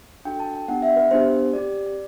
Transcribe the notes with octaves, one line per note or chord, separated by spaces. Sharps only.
D4 F#4 A4 G5
A5
G5
B3 D4 G4 F#5
E5
B4
B3 D4 G4 C5
C4 G4 D5